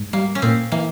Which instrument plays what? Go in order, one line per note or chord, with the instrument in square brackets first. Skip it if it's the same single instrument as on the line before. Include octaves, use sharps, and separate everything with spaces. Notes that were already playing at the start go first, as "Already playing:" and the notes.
Already playing: [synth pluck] G#2
[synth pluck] G3 [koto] A#3
[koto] C#4
[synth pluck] A#2 [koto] C4
[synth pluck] E3 [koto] A#3